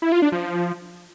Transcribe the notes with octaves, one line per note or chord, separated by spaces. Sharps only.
E4
F4
D4
F3